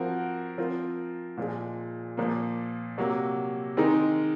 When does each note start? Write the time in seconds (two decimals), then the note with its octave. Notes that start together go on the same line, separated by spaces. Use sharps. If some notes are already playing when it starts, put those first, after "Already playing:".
Already playing: F3 C4 F#4 A#4
0.58 F3 C4 F4 A#4
1.37 A#2 F3 G#3
2.17 A#2 F3 A#3
2.98 C3 F#3 A#3
3.77 D#3 G#3 C4 D#4 A#4